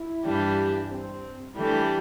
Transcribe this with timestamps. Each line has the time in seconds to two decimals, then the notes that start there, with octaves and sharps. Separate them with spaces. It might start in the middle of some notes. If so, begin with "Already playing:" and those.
Already playing: E4
0.24 G2 E3 G3 D4 G4
0.90 C4
1.55 E3 G3 A3 D4 G4